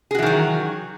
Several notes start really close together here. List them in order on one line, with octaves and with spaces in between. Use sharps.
G#4 F#4 E3 D#3 F#3